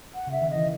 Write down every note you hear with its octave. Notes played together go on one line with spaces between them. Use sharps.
F#5
C#3 E5
D#3
E3 D#5